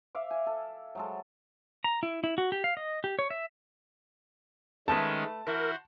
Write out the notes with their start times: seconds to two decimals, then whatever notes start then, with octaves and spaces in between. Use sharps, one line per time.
0.15 E5 F5 D6
0.30 G#5
0.46 A4
0.95 F#3 G#3 A4
1.84 A#5
2.03 E4
2.24 E4
2.38 F#4
2.52 G4
2.64 F5
2.77 D#5
3.04 G4
3.19 C#5
3.30 E5
4.88 D#3 G#3 A3 C#4 B4 A5
5.47 E3 E4 F#4 A#4 C5